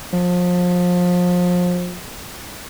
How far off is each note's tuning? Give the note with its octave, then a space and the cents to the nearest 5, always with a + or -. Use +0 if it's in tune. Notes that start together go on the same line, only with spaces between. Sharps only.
F3 +30